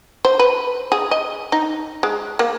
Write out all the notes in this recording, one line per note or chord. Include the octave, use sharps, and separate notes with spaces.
C5
B4
G#4
D#5
D#4
G#3
A#3